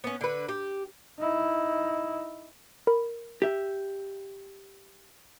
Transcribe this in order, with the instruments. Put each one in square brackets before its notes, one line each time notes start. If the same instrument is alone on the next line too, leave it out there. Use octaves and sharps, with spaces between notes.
[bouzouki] B3 C#4
D3 B4
G4
[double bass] D#4 E4
[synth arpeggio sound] A#4 B5
[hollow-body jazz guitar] G4 E5